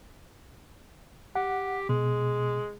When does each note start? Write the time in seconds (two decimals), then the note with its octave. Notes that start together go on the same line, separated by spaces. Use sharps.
1.35 G4 F#5
1.89 B2 G#3